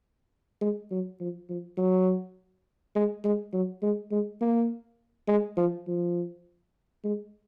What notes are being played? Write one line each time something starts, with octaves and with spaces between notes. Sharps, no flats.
G#3
F#3
F3
F3
F#3
G#3
G#3
F#3
G#3
G#3
A#3
G#3
F3
F3
G#3